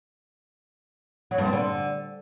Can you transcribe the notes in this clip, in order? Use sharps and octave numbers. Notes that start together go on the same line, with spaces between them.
F#3
G2
C4
D3